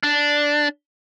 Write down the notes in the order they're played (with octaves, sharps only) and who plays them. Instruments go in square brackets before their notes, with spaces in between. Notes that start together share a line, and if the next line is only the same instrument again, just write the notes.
[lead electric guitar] D4